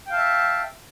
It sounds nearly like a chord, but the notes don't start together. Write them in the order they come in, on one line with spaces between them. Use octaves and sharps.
G5 F5 A5 E5